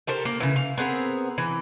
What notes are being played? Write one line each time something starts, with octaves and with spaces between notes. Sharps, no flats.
G4 A4 A#4 C5
A#3
C#3 E3
F5
B3 C4 G#4 A#4
E3